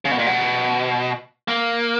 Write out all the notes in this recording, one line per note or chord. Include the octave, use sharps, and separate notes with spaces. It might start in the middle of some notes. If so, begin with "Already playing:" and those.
C#3
B2
A#2
B2
A#3